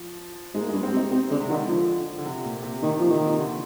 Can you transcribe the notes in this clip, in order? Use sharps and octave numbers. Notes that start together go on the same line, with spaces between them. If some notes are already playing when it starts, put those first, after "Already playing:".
Already playing: F3
G#2 G#3
A#3
G2 G#3
C4
C3
D#4
C3 C4
D3 G#3
C3
D3 D#3
D3 F3
D3
C3
A#2
C3
A#2 D#3
C3 F3
A#2 D#3
C3
D3